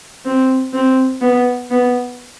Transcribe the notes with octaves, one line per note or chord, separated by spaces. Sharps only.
C4
C4
B3
B3